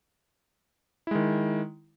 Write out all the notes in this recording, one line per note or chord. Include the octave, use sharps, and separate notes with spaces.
D#3 G#3 E4